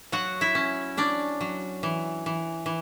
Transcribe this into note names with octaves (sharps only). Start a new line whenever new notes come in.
F#3 F#4 F#5
E4 E5
C#4
C#4 D4 D5
F#3
E3
E3
E3